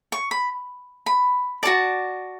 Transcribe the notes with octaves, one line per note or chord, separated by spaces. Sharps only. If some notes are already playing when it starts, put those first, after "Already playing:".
C#6
B5
B5
F#4 A4 D5 A5